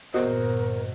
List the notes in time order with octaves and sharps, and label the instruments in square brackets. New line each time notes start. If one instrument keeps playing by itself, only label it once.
[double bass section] G1 A#2 [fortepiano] E2 F#4 D#5 [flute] A#4 [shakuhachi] C5